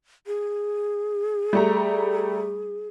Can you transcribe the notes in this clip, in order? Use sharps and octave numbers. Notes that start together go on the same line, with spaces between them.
G#4
G3 A3 A#5